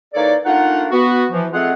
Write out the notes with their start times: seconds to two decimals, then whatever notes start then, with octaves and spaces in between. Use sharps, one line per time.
0.14 E3 A#3 D#4 A4 C#5 D5
0.46 A3 A#3 D4 D#4 F4 F#5
0.91 B3 F#4
1.32 E3 F3
1.52 G#3 A3 C4 F4 G#4 F#5